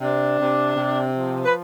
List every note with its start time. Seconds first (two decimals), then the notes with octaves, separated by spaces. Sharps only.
0.01 C3 D4
0.38 C3
0.77 C3
1.15 F3
1.44 B4